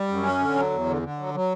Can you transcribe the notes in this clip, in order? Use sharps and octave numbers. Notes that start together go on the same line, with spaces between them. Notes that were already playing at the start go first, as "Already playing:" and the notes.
Already playing: G3
F#2
C#4
D3
F#3
E2
D3
D3
F#3
F#3